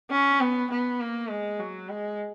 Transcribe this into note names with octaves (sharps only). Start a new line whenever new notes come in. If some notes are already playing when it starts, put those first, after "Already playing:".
C#4
B3
B3
A#3
G#3
F#3
G#3